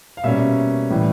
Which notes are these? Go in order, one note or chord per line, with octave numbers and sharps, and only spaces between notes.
F5
B2 G3 A#3 C#4 E5
A2 E3 G3